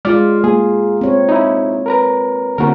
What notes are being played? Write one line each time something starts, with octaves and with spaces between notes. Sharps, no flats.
G#3 F4 D5 F6
A#3 G#4
C4 C#5
D#4 E4
A#4 B4 A#5
D3 A#3 C4 E4 F#4 A#4